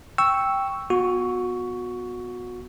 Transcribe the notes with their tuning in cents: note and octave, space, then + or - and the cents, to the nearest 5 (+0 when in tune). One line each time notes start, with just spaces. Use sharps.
G5 +0 C#6 +0 E6 +0
B3 +0 F#4 -30 C#6 +10